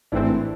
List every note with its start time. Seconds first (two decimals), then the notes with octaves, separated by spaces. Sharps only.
0.12 A1 G#2 E3 A3 C4 D4 E4